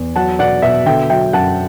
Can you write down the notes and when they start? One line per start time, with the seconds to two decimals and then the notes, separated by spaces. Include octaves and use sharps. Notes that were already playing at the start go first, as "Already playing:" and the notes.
Already playing: E2
0.15 F#3 F#5 A5
0.39 B2 D5 F#5
0.62 B2 E5
0.86 D3 E5 G5
1.10 F#3 E5 G5
1.33 F#2 F#5 A5